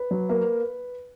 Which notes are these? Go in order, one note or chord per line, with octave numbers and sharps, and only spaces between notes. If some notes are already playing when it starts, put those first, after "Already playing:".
Already playing: B4
F#3
A#3